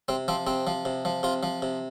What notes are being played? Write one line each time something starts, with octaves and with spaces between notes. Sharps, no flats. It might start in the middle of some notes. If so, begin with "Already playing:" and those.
C3 C4
F3 C4
C3 C4
F3
C3
F3
C3 F4
F3
C3